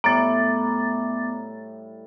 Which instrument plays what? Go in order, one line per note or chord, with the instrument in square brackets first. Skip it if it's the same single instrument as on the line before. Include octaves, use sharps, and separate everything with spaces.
[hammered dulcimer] A2 G3 [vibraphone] B3 D6 [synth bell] A#5 A6